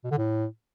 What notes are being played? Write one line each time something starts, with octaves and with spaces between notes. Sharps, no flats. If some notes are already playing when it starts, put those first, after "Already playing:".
B2
D3
A2